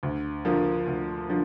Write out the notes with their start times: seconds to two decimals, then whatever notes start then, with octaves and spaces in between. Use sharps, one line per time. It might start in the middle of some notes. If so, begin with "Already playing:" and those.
0.03 D2
0.45 D3 F3 A#3
0.86 D2
1.29 D3 F3